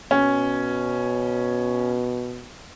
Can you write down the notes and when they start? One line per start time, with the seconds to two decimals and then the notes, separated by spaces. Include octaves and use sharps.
0.11 B2 C#4